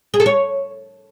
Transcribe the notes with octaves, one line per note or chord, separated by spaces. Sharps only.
G#4
A4
C#5